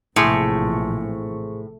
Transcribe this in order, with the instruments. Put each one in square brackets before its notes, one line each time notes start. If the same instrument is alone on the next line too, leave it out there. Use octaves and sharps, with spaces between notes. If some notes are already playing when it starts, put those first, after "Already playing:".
[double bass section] A#1 C3 E3 [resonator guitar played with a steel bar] A2 [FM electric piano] G#4 C5 C#6